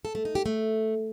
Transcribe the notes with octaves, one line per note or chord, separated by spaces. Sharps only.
A4
A3
D#4
G4
A3